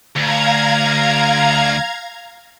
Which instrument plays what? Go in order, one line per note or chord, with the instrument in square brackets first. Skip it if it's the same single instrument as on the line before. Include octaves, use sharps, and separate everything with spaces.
[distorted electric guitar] D2 [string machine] F5 A#5 G#6